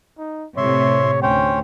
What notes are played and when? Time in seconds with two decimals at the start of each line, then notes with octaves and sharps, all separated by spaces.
0.18 D#4
0.57 A2 C3 C#5 E5 C6
1.22 D2 C#4 C5 C#5 G5